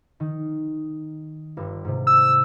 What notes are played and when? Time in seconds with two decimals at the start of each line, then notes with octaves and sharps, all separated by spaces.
0.20 D#3
1.57 G1 G2
1.85 G#2 C3
2.07 E6